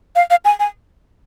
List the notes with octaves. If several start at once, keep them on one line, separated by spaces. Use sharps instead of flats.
F5
F5
G#5
G#5